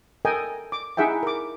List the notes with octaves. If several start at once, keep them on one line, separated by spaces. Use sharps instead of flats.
A4 A#4 D#5 G5 G#5
D6
D#4 E4 G#4 E5 F#5 G5
A#4 D6